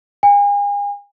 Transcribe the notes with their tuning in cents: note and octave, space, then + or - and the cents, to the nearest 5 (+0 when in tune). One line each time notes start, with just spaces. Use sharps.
G#5 -40